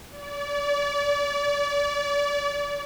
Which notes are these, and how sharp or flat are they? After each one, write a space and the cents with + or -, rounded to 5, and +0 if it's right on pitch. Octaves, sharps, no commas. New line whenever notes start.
D5 -35